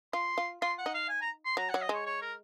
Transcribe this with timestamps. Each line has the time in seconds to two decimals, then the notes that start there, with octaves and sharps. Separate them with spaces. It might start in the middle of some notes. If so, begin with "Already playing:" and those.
0.13 F4 C6
0.38 F4
0.61 F4 C6
0.78 F#5
0.86 D#4
0.94 F5
1.09 G#5
1.21 A#5
1.45 C6
1.57 F#3 A#5
1.70 F#5
1.74 F#3
1.81 D#5
1.89 G#3 C#5
2.06 C#5
2.21 A#4